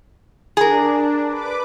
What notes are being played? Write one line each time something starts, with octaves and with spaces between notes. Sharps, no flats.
D4 G#4 A#4
B4 D6